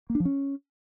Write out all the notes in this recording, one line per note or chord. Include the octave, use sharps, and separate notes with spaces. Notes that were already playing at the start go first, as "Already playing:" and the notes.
A#3
D4
F3
C#4